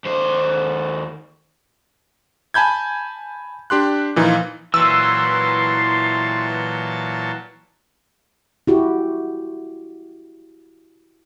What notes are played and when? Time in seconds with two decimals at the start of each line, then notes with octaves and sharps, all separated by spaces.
0.06 D#2 C5
2.54 G#5 A5 B5 G6 G#6
3.70 D4 G4 C6 F#6
4.16 A#2 E3 F3 D#4 F4
4.74 A#2 E3 F#3 A5 C6 E6
8.67 E4 F#4 G4